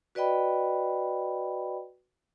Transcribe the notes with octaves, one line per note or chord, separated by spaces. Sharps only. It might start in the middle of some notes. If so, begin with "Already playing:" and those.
F#4 B4 D5 D#5 G5 B5